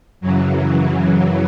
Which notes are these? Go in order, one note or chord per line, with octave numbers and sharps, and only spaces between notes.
F#2 C#3 E3 F#3
E3
F#3